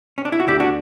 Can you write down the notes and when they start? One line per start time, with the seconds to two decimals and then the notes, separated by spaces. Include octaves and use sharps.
0.18 C#4
0.25 D4
0.32 E4
0.40 F#4
0.47 D2 D3 E4 G4
0.60 D4 F#4